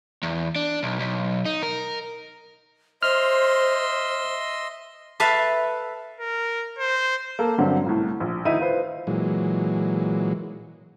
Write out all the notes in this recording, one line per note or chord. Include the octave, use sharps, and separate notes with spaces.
E2
D4
B1
B1
D#4
A#4
C5 D#5 E5 C6 F6
A4 B4 E5 F5 A5
A#4
C5
A#3 A4
G2 D3 F#3 C4
C2 A2
A#1
D2 D#3 D#4 E4 E5 D#7
F4 B4 C5
A#2 E3 F#3 G#3